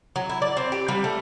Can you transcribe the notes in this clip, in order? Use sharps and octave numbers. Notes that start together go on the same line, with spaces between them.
F#3
E4
D5
C4
G4
G3
A3